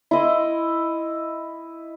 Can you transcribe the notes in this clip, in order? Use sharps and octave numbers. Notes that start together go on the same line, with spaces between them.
E4 D#5 C6